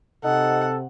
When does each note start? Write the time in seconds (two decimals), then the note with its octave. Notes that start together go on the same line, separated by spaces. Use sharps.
0.24 C3 D#4 A4 F#5